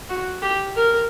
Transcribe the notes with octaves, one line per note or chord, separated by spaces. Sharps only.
F#4
G4
A#4